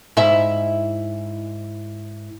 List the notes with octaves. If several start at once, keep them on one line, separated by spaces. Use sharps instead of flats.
G#2 E4 E5